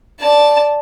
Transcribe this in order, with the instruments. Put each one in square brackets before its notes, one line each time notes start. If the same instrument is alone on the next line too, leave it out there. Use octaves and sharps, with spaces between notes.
[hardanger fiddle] D5 A5